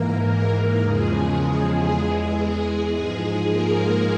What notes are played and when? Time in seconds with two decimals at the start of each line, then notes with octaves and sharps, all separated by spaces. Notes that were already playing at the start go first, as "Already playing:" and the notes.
Already playing: G#2 E3 A#3 A#4
0.80 E2 C#3 F3 G#3 G#4
1.87 E2 E3
2.40 G#3 G#4
2.94 G#2 F3 G#3 G#4
3.48 A#3 A#4